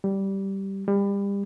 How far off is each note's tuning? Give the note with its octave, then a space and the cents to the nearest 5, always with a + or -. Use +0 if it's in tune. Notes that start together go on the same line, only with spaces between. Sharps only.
G3 -10
G3 +30